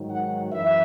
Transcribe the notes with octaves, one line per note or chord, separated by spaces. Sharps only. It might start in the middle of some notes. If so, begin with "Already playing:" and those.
Already playing: G#2 D#3 F#3
F#5
F#2 E3 E5